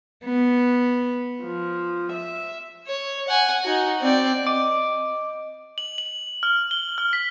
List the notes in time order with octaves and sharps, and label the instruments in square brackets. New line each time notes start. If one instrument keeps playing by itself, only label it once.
[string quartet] B3
F3
E5
[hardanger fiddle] C#5
F#5 G#5
D#4 F#4
C4 D5
[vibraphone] D#5 [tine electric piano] D6
[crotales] F#7
F#7
F6
G7
F6
B6